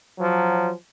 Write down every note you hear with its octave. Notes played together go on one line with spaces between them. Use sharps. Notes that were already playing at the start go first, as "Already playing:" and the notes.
F3 F#3